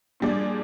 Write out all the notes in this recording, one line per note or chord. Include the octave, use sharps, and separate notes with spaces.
A#2 G3 D4 G#4 D5